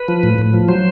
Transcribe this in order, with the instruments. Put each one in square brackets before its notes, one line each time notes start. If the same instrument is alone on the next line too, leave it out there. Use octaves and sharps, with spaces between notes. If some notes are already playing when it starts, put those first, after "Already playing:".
Already playing: [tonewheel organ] B4
F3
A2
A2
F3
F#3 C5